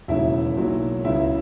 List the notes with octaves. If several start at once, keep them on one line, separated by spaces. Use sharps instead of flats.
E1 D#2 C#3 F#3 E4 E5
B1 A#2 F#3
C#2 C#3 F#3 E4 E5